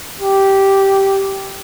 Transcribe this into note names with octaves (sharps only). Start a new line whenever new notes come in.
G4